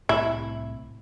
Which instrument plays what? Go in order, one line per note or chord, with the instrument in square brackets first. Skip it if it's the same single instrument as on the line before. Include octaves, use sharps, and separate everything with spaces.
[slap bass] C2 A2 C4 [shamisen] E4